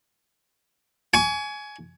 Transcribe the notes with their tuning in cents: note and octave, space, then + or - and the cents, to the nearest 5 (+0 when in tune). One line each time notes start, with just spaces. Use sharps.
G#5 +15 C#6 +40